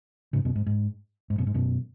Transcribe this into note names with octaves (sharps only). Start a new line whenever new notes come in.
G#2 C#3
F#2 B2
G#2
G#2
G#2
F#2 B2
G#2
F#2 B2